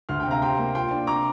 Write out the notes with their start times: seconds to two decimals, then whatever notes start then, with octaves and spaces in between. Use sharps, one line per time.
0.09 D2 C6 F6
0.20 G5
0.26 C3
0.31 F5 A#5
0.42 G4 G5 C6
0.59 A#3
0.75 F4 G5 C6
0.91 D4
1.07 C3 A#5 D6